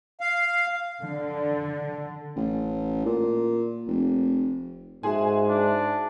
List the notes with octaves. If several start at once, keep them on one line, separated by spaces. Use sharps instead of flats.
F5
D3
A1
A#2
F1
G#2 F#4 G#4 E5 G#5 C6
D4